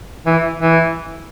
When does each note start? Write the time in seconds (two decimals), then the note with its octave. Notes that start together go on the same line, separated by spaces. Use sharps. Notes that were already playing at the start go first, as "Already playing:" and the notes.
0.26 E3
0.59 E3